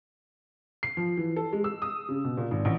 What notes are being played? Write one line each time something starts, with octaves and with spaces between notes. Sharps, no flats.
C7
F3
E3
A4
G#3
E6
D#6
C#3
B2
A#2
G#1
A1